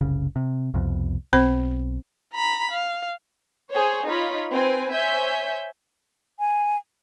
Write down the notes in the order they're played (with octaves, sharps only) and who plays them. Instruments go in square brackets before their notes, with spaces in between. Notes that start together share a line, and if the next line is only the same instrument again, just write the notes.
[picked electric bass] F#1 C2 C#3
C3
C2 F2 B2
[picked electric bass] B1 [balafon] C4 C5 B5
[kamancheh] A#5 B5
F5
[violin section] G#4 C5 C#5
D#4 F4 C#5 B5
C4 B4 G#5
C5 C#5 E5 G#5 G6
[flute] G#5